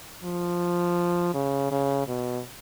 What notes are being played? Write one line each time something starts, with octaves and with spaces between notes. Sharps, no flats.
F3
C#3
C#3
B2